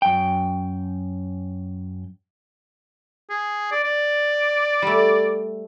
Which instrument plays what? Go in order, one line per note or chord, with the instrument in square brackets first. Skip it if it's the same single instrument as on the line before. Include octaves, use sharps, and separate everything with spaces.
[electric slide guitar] F#2 G5
[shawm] G#4
D5
D5
[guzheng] G3 A3